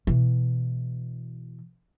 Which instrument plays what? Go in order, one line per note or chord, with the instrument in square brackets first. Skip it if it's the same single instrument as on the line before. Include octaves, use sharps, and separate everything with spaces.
[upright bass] B2 E3